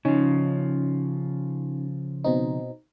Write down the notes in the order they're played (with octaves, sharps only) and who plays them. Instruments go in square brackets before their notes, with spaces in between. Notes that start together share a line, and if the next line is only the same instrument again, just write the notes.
[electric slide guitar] C#3 F3 [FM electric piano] C#4 D#4
[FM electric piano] B2 C4 D#4